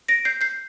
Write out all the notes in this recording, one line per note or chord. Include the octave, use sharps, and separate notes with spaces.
A#6 D7
G6 C7
G6 C7